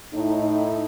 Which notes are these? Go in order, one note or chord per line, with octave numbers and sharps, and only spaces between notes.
A2 D#4